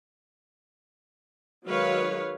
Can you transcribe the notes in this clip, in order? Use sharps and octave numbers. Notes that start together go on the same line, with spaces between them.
D#3 F#3 G#3 B4 C#5 F5